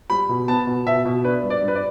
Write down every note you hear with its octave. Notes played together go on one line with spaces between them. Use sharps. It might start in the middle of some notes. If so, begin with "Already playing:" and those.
G3 B5
B2
B3 A5
B2
B2 E5
B2
D4 B4
G2
D5
G2
B4
D5